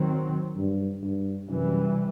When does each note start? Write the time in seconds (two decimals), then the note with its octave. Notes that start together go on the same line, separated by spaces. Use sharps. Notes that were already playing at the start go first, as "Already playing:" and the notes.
Already playing: D#3 F#3 C4
0.57 G2
1.03 G2
1.49 F#2 C3 E3 G3